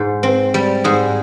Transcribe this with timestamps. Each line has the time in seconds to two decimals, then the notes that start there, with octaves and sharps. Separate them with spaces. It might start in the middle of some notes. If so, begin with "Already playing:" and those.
Already playing: G#2
0.23 C4
0.54 G3
0.84 G#2 G#4